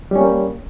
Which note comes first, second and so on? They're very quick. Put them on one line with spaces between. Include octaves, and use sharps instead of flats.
G3 C#4 A#3